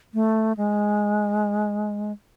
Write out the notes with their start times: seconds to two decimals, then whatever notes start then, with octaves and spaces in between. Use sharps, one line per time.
0.14 A3
0.57 G#3